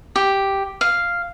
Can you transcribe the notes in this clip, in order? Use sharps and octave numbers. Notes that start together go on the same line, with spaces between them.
G4
F5